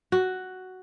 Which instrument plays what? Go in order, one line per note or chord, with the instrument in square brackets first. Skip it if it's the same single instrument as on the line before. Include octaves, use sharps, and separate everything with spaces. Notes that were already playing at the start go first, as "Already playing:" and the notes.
[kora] F#4